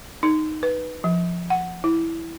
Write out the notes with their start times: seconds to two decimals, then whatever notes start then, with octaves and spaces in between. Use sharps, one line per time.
0.23 D#4
0.63 B4
1.04 F3
1.50 F#5
1.84 E4